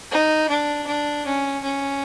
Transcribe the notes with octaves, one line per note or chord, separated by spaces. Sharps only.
D#4
D4
D4
C#4
C#4